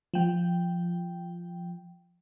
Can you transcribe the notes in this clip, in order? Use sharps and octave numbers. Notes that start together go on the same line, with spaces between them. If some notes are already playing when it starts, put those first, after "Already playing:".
F3 G5